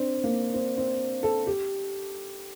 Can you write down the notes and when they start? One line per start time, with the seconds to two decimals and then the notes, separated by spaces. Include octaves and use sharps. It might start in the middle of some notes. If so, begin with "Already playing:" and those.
Already playing: C4 D4
0.24 A#3
0.54 C4
0.77 C4
1.23 A4
1.47 G4